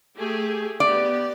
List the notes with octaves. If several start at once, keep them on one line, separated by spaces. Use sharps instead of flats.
A3 G4 G#4
B3 G4 D5